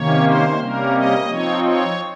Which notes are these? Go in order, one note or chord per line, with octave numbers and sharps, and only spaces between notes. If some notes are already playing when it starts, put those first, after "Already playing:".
Already playing: C3 D#3 A#3 C#4 C#5
C5
C3 G3 A#3 C#4 A#4
D#5
F3 C4 D#4 C#5
C#5